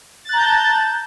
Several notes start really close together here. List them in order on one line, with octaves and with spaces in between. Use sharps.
A6 F#6 A#5 G6 A5